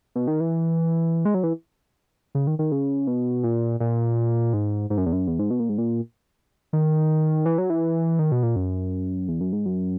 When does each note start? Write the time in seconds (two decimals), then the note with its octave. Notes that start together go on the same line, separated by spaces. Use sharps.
0.15 B2
0.28 D#3
0.40 E3
1.25 G#3
1.34 F#3
1.43 E3
2.35 C#3
2.47 D#3
2.59 D#3
2.72 C#3
3.07 B2
3.44 A#2
3.80 A#2
4.53 G#2
4.90 G#2
4.97 F#2
5.06 E2
5.13 F#2
5.27 E2
5.39 G#2
5.51 B2
5.60 A#2
5.69 G#2
5.78 A#2
6.73 D#3
7.46 E3
7.58 F#3
7.70 E3
8.19 D#3
8.32 B2
8.43 A#2
8.56 F#2
9.28 E2
9.41 F#2
9.53 G#2
9.66 F#2